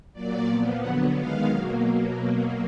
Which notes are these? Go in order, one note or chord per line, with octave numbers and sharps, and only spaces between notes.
A#2 F#3 A#3 D5
A#2 F3 B3
D3 F#3 B3 F#5
D#3 G#3 B3 F5
B2 F#3 A#3